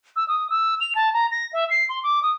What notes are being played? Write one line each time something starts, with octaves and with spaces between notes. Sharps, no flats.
E6
D#6
E6
F7
A5
A#5
A#6
E5
C7
C6
D6
D#6